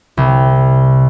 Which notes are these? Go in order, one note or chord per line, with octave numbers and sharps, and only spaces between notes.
C2